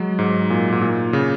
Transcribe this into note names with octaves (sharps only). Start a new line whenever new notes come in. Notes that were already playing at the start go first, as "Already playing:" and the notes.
Already playing: F#3 G#3
G#2
A#2
G#2
A#2
C#3